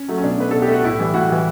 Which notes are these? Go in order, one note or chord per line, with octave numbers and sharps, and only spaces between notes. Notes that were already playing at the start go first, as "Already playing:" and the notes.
Already playing: C#4
F#3 A3
C#4
B2 D4
A3 B4
B2 A4
G4
A3
F#4
A2 E4
E3 G3
A2 F#4
E3 G3